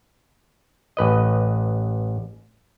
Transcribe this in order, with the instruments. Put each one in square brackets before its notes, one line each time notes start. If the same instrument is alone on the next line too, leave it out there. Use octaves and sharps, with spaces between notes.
[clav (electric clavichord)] A1 B4 D#5